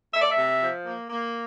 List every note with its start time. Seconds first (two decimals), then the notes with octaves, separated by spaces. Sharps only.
0.13 A3 E5
0.22 D5
0.31 E5
0.37 C3
0.62 F3
0.86 A#3
1.10 A#3